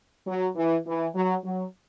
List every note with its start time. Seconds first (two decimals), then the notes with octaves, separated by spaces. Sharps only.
0.27 F#3
0.56 E3
0.86 E3
1.15 F#3
1.44 F#3